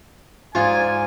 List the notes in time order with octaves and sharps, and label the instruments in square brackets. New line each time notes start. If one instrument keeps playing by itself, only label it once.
[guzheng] G#2 G#4 D5 [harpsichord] F4 [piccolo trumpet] G#5